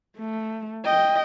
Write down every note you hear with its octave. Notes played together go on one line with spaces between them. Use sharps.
A3
D#5 G5